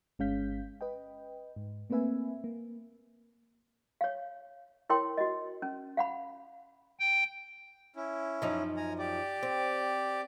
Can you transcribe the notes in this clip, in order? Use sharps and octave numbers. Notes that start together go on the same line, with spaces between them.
G1 G#3 C#4 F5 G6 B6
B4 D#5 G5
G#2
A3 A#3 C4 B4 E5 G#5
A#3
C#5 F5
E4 A#4 C#5 G5 C6
F#4 D#5
C#4
F5 F#5 B5
G5
C#4 E4
F#2 F3 D#4
G#5 A#5
G4 D5
C4